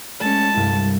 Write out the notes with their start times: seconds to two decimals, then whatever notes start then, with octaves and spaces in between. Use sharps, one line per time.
0.21 G#3 A3 C#4 A5
0.56 C2 G2 E4